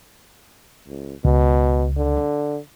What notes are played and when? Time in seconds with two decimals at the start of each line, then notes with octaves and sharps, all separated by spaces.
0.88 C#2
1.25 C#2 B2
1.97 D3